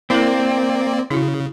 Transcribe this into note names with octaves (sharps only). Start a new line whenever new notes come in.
A#3 C4 E4 A#4 D5
C#3 E4 F#4